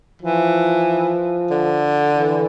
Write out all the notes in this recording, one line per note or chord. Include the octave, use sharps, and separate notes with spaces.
E3 F3
D3
E3